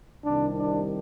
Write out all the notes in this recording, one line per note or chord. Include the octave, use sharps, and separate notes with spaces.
C2 C3 D#3 D4
D4